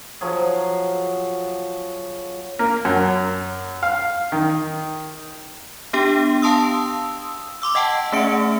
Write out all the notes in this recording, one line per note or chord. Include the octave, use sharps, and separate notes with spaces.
F3 F#3 G#4
A#3
F#2
F5
D#3
B3 D4 G4 G5
F5 G5 A5 C6 D#6 E6
C6 D6 E6
D#5 F#5 G5 A5
A3 C#4 G#4 E5 C#7 D7